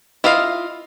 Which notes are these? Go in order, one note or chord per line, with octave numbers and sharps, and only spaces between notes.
E4 F4 D#5 F5